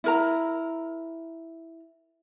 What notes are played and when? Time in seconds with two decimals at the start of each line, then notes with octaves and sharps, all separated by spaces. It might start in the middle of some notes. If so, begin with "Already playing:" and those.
0.04 E4 A#4 A#5